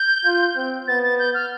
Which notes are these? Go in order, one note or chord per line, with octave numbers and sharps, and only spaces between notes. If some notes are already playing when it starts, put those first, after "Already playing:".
Already playing: G6
F4
C4
B3 A6
A6
G6
F6